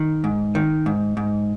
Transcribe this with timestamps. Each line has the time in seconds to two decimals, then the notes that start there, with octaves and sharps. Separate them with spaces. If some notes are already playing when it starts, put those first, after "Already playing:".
Already playing: D#3
0.24 G#2
0.55 D#3
0.86 G#2
1.17 G#2